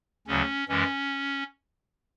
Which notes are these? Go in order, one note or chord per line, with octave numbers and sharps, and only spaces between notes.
D2 C#3 F#3 C#4
F#2 E3 G#3 C#4